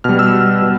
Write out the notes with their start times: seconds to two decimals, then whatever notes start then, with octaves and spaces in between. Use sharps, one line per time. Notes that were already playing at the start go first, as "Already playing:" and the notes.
0.04 B2 G3 F6
0.19 E6
0.62 B2